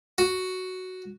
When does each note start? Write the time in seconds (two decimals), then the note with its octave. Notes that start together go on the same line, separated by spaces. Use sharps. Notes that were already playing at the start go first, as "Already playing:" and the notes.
0.18 F#4